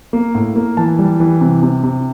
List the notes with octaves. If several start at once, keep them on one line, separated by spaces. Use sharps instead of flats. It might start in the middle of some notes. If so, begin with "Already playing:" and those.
A#3
A2
A#3
E3 A5
G3
E3
C3
C3
C3